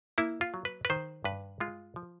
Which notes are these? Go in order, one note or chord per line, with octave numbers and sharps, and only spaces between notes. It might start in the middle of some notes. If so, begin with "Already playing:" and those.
A#3 E4
F4
F#3
B4
B4
D#3 C5
G2 B4
G#3 F4
F3